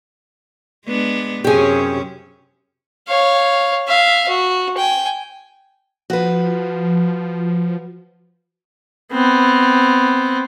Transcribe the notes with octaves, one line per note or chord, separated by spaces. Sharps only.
G#3 B3 D4
F#2 C3 C#4 G4 G#4
C#5 F5
E5 F5
F#4
G5 G#5
F3 F#4 B4
B3 C4